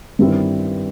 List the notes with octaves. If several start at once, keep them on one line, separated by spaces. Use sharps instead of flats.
G2 D#3 G3 C4 E4